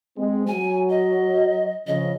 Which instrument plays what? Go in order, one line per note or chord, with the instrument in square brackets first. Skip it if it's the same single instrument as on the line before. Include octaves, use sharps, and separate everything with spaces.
[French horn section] G#3 C4
[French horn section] F#3 [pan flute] G#5
[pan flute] D#5
[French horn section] C#3 F3 [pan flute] D#5